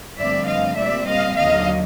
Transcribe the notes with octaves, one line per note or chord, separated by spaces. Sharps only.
G2 D3 F3 A3 C4 D5 E5
D#5 F5
A#2 G3 C4 D5 E5
D#5 F5
D#2 D3 F#3 D#5 F5